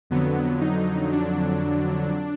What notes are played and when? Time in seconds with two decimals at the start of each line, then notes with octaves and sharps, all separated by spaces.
0.10 F2 D3 F#3 B3
0.61 D#4
1.12 D4